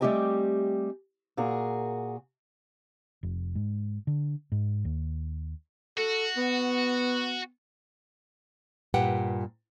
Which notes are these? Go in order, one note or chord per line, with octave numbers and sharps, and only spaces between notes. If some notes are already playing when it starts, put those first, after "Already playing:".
G3 A3 C4 G4 D#5 G#5
A#2 F#4 G#4 A#4
F1
G#2
D3
G#2
D#2
F#4 A4
B3
G2 A#2 G4 B4 F#5 G5